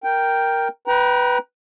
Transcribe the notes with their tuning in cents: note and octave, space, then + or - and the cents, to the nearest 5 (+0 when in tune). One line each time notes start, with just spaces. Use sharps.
A#4 +0 G5 +0
B4 +0 G5 -20 A#5 +30